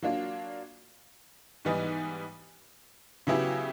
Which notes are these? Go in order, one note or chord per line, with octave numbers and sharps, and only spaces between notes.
F#3 A#3 D4 F4
G#2 E3 G3 B3 D#4
C#3 F#3 B3 E4 G4